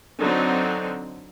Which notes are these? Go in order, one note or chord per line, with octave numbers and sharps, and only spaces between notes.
D3 F#3 C4 D#4